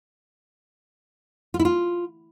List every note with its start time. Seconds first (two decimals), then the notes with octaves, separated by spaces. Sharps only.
1.54 F4
1.59 E4
1.65 F4